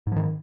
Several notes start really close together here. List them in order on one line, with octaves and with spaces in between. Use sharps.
G#2 F3 D#3